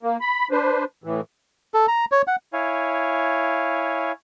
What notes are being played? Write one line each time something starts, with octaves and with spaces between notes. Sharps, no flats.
A#3
B5
D4 B4 C5
A2 E3
A4
A#5
C#5
F#5
E4 C#5 F5 G#5